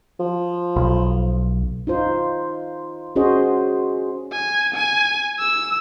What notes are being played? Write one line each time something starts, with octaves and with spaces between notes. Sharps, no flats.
F3
B1
D#4 F4 C5
C#4 F#4 G#4 C5 D#5
G#5
G#5
E6